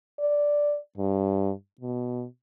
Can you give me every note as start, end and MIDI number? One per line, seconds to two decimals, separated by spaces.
0.20 0.78 74
0.98 1.52 43
1.81 2.25 47